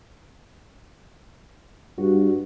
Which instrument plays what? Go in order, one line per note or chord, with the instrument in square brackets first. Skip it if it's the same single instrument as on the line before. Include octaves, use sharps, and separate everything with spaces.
[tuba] G2 [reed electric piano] F#4